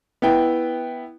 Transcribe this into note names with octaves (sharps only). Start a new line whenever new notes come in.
B3 E4 G5